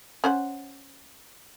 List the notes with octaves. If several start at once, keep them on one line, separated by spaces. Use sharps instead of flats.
C#4 C5 F#5